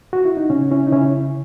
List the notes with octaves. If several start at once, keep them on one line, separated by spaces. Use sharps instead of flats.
F#4
E4
D#4
C#3 C#4
C#4 E4
D#4
C#3 C#4 E4